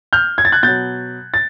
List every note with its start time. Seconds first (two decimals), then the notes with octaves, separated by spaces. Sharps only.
0.13 F6 G6
0.38 G#6
0.45 A6
0.52 F#6 G#6
0.63 B2 F#3 G6 A6
1.34 A6